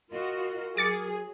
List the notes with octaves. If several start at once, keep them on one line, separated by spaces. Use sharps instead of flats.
F4 F#4 A#4 D#5
F#3 G#4 D6 A6 C#7